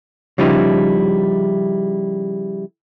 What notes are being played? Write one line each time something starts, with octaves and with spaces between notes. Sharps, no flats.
C#3 F3 G3 D#4 E4